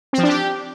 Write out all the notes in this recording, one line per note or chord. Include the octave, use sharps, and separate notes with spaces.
C4
F3
D4
G4